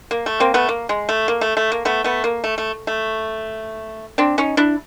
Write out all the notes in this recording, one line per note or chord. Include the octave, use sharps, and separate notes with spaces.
A#3
A3
A#3 C4
A3 B3
A#3
G#3
A3
A#3
A3
A3
A#3
A3 B3
A3 B3
A#3
A3
A3
A3
C4 D4
C#4 D#4
D4 E4